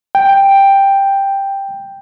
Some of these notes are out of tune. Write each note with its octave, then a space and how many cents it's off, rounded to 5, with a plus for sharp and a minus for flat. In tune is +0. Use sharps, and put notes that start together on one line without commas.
G5 +5